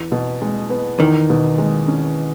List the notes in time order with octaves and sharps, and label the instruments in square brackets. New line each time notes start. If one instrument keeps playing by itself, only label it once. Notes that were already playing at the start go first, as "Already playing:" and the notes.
Already playing: [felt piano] E2
B2
G#3
B3
[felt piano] E2 [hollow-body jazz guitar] D#3
[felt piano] B2
G#3
C#4